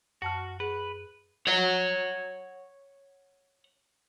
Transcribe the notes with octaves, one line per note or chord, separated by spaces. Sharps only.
F#2 F#4 A5 F6
G#4 B4
C#5 F#5